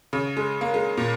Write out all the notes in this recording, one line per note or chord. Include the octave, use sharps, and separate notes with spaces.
C#3
G#3
A#3
G#3
A#2